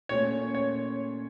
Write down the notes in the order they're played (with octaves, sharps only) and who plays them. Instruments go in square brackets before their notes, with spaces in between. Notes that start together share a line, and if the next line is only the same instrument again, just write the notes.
[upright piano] A#2 A3 C#4 [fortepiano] C#5
[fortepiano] C#5